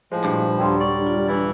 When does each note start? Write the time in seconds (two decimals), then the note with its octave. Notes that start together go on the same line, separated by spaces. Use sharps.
0.12 A2 F3 G#3 C5
0.24 G2 A#2
0.58 D#2 D3 F#3 G3 C6
0.80 D5 C#6
1.07 F4
1.28 E3 E4